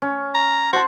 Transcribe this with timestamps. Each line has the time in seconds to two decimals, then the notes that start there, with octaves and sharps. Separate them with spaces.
0.02 C#4
0.34 A#5
0.73 F#4 C5 F#5 A5